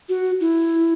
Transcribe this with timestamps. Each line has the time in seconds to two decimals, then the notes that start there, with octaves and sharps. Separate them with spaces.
0.09 F#4
0.40 E4